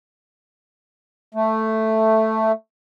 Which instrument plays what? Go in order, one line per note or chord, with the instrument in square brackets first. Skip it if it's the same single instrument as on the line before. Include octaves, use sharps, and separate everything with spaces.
[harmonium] A3